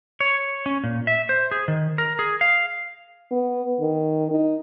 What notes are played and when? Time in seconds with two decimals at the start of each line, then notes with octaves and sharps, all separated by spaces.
0.20 C#5
0.66 C#4
0.84 A#2
1.07 E5
1.29 C5
1.51 G#4
1.68 D#3
1.98 A#4
2.19 G#4
2.41 F5
3.31 B3
3.80 D#3
4.31 D#4